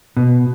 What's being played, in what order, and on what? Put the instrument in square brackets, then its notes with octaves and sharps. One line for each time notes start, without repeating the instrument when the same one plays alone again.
[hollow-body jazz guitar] B2